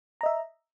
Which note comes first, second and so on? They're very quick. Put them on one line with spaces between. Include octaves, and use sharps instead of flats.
A#5 D#5 E5